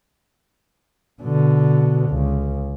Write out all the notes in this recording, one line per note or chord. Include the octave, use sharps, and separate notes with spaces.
B2 D3
C#2